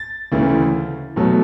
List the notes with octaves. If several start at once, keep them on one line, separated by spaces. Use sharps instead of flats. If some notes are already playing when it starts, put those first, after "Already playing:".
Already playing: A6
D2 C#3 E3 A3
E2 B2 F#3 A3